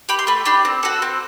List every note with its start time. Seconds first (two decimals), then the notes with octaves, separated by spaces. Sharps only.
0.09 G4 B5
0.19 C6
0.27 A3 B5
0.45 D4 G4 B5
0.65 C4
0.83 F#4 A4
1.02 C4